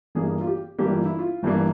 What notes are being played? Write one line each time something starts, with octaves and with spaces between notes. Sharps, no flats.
G1 G2 E3 A#3 G#4
F4
G4
G1 G2 E3 A#3 G4
F4
E4
F4
G1 G2 E3 A#3